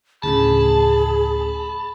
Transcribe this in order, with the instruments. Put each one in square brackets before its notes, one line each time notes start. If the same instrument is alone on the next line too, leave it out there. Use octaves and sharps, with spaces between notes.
[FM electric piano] D2 A2 C#3 [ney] G#4 [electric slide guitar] A5 [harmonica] B5